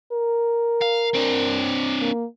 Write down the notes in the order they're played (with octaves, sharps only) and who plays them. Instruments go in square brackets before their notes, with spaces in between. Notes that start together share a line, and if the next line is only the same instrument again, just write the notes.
[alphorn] A#4
[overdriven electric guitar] F5
C4 D4
[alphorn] A#3